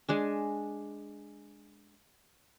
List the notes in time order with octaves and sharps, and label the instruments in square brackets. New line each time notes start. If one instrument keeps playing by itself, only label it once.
[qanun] G#3 D4 G#5